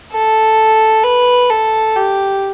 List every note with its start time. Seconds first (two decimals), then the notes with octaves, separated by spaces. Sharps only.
0.12 A4
1.04 B4
1.50 A4
1.96 G4